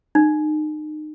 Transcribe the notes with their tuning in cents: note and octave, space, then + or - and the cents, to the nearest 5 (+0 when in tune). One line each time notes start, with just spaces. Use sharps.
D#4 -30